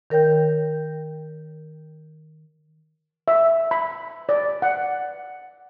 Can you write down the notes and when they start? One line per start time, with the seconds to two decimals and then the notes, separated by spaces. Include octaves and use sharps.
0.10 D#3 A#4 C#5 G5 G6
3.28 E5
3.71 B5
4.29 D5
4.62 F#5